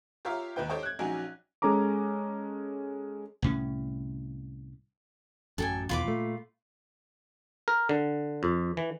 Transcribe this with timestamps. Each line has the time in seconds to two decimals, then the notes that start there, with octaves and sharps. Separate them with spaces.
0.25 F4 G4 A#4 C#5 E5 F5
0.56 D#2 D#3 D#4 B4 G5 G6
0.69 G4 A4 C5 C#5 D#5 G5
0.83 F#6 G#6
0.99 A#1 F#3 C#4 D#4 F#4 G#5
1.62 G#3 C#4 A4 A#5 D6
3.42 C2 A2 C#4
5.58 A1 F#2 A4 G5 G#5
5.89 B1 E2 F4 B5 D6
6.05 A#2 A3
7.68 A#4
7.89 D3
8.43 F2
8.77 E3